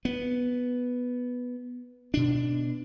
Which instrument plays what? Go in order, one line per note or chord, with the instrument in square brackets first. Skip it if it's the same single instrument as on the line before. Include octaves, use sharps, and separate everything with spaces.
[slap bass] B3
B2 D4